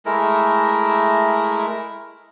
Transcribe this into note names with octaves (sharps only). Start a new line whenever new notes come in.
G#3 A3 E4 A#4